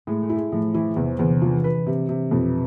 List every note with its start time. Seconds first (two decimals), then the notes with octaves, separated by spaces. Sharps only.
0.07 A2 G#3
0.23 A3
0.29 E4
0.36 G#3
0.52 A2 F3
0.74 E3 E4
0.96 E2 C3
1.19 E2 D3
1.41 E3 F3
1.64 B4
1.86 C3
2.09 C3
2.31 F2 B2